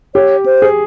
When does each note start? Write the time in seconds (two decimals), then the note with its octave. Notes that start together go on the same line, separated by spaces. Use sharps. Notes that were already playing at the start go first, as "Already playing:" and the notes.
0.15 G4 C#5
0.46 C5
0.62 G#4